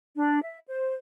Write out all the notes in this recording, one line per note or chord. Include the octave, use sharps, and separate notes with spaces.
D4
E5
C5